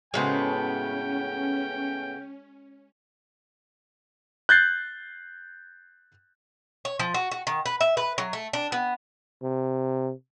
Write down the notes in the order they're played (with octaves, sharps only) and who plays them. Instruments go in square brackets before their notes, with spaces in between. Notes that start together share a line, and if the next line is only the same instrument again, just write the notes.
[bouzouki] A2 C#3 B3 [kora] G#3 F#4 C5 [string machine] C#4 [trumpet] G5
[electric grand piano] F#6 G6 A6 C7
[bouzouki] C#5
F3
F#4
F#4
D#3
B4
E5
B4
F#3
A3
D4
B3
[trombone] C3